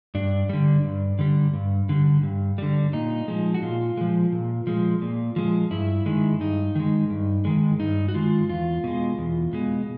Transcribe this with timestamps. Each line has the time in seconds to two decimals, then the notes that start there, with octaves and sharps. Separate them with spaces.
0.15 G2 D4
0.49 D3 G3
0.84 G2
1.19 D3 G3
1.53 G2
1.89 D3 G3
2.23 G2
2.58 D3 G3
2.93 A#2 D#4
3.28 F3 G#3
3.54 F#4
3.62 A#2 F4
3.97 F3 G#3
4.32 A#2
4.67 F3 G#3
5.01 A#2
5.36 F3 G#3
5.71 G2 E4
6.06 D#3 G#3
6.40 G2 D#4
6.75 D#3 G#3
7.10 G2
7.45 D#3 G#3
7.79 G2 D#4
8.08 F#4
8.14 D#3 G#3 F4
8.49 E2 F4
8.84 B2 G#3
9.18 E2
9.53 B2 G#3